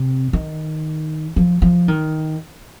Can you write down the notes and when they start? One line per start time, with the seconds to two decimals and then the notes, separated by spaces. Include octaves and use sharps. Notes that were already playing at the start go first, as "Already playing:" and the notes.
Already playing: C3
0.33 D#3
1.36 F3
1.62 F3
1.88 D#3